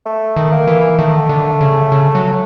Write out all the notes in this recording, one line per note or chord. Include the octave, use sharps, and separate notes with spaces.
A3
D#3
A#3
E3
D#3 A3
D3
C#3
C#3
F#3